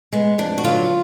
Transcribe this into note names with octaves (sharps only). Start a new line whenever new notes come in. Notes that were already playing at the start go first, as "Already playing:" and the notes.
G#3 B3
F2 D4
F#4
D3 F#3 B3 F4